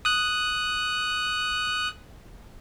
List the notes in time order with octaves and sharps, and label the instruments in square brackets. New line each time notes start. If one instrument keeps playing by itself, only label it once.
[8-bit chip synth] D#6 F#6